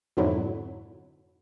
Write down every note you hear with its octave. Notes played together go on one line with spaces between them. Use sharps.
F2 G#2 B2 D3 F#3 E4